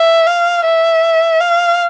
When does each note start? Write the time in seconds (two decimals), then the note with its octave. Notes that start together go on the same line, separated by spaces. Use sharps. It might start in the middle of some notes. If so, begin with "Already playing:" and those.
Already playing: E5
0.26 F5
0.65 E5
1.40 F5